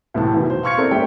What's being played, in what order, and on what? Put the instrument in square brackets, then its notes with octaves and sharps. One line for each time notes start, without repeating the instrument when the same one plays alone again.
[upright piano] C2 A2 E3 A5
E2 B2 D#3
C5
F5 C6 C#6 F6 G#6 C#7
C4 E4 A4 A#4 C5 D5
G#2 A#3 C#4 G4 E5 G5